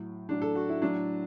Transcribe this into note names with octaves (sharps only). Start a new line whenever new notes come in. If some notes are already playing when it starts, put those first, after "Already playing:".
Already playing: A2 F#3
A2 F#3 D4
A4
F#4
E4
A2 F#3 D4